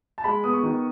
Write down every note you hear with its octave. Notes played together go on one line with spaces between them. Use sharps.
A5
G#3 B5
B3 D#6
C#6
D#3